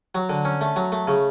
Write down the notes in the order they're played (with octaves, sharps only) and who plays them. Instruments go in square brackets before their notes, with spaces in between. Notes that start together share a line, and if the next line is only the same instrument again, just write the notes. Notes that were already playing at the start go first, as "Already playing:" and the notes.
[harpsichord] F#3
D3
C#4
A3
F#3
A3
C#3